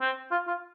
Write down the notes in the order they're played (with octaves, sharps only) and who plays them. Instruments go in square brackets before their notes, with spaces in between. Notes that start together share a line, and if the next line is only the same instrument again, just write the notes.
[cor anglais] C4
F4
F4